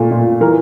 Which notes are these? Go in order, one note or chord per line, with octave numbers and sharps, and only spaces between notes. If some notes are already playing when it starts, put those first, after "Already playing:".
Already playing: A#2 A3
A#2
E3 A#4